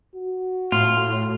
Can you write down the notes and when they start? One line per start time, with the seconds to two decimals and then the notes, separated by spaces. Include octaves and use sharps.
0.16 F#4
0.72 A2 F4